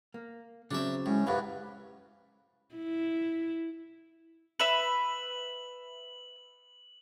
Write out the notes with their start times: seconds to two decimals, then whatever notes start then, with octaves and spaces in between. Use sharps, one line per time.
0.14 A#3
0.71 C#3 F#3 C4 D4 E5
1.06 A2 G#3 C#4
1.27 C2 F#2 A2 B4 F5
2.75 E4
4.60 B4 E5 B5 F#7